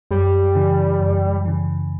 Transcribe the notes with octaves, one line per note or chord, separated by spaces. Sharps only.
F#2 G3
C#3 E3
F#2
C#3 E3